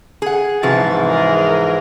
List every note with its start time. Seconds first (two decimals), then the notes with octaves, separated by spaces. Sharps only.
0.22 G#4 F#5
0.63 G#2 C3 E3 F3 F#4 A6
1.05 G#4 A#4